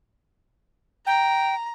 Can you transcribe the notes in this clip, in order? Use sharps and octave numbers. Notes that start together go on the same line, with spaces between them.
G5 A#5